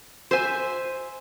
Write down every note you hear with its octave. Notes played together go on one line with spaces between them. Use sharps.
C5 E5 G#5